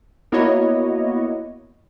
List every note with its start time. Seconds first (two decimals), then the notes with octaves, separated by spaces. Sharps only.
0.32 A#3 B3 E4 F#4 C#5 D#5